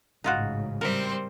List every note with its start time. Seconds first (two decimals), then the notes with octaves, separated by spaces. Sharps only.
0.24 A1 G#2 C#3 D#4 F4 F#4
0.81 G3 C4 A#4 C5 E5